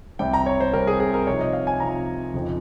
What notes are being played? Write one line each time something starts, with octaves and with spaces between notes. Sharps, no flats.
C2 C3 G3 C4 G5
A#5
C#5
C5
C2 C3 G3 C4 A#4
G#4
G#4
A#4
C3 F3 C4 D#4 C#5
D#5
F5
G#5
C3 F3 C4 D#4 A#5
F2 C#3 F3 C4 D#4